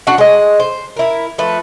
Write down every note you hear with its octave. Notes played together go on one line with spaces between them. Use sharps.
D4 F#4 F#5
G#3 D#5
C5
E4 A#4
F3 A3 B4